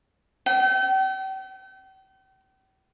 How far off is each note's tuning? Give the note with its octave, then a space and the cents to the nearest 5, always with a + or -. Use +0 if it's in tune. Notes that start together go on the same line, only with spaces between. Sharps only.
G5 -40